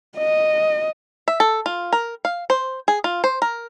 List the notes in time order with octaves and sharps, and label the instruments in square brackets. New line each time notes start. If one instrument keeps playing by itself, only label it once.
[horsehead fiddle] D#5
[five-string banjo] E5
A4
F4
A#4
F5
C5
G#4
F4
C5
A#4